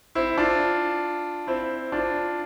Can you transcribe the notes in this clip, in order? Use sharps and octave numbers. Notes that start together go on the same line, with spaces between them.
C4 E4
D4 F4
C4 E4
D4 F4